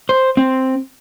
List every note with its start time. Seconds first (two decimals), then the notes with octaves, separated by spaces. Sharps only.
0.09 C5
0.37 C4